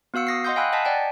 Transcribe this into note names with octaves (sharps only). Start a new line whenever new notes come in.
B3 F#4 F5 E6 C#7
D#6 A#6 C7
D#5 F#5 C6 D#6 G6
F5 G5 G#5 B5 E6 F#6
D#5 F#5 G#5 A5 B6
D5 G5 G#5